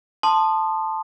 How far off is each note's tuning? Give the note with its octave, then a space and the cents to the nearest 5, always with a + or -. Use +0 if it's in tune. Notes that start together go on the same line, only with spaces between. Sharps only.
A5 +0 C6 +0 D#6 -30